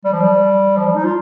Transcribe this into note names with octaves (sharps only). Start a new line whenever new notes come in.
G3
F3
G3
F3
G3
D#4
F4